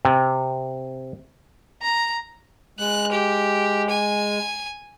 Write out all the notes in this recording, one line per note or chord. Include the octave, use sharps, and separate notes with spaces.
C3
A#5
G#3 F#6
G4
G#5